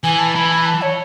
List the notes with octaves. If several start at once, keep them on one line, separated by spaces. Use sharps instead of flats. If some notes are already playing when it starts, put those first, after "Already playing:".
E3 G#5
A5
E3 B5
B5
A5
C#5